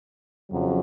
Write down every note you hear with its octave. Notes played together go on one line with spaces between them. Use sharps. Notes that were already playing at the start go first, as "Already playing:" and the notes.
F2 C#3 F#3